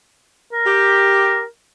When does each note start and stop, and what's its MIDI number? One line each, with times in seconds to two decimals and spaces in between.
0.53 1.45 70
0.67 1.42 67